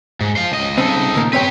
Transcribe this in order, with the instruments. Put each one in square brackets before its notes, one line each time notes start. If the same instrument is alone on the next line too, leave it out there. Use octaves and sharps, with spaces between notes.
[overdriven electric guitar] G#2
C5 F5
C#2 D#5
[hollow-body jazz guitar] C2 C#3 C4 [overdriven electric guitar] D#4 A4
[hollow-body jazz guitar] A#2 D#3 A#3
[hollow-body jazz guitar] C4 C#5 G5 [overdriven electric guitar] G4 B4